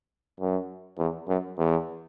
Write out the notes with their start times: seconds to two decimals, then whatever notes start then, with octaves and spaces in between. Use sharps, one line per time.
0.40 F#2
0.98 E2
1.28 F#2
1.58 E2